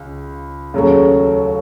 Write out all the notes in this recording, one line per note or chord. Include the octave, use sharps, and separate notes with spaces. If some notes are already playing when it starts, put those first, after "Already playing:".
Already playing: C#2
D#2 C#3 F#3 A3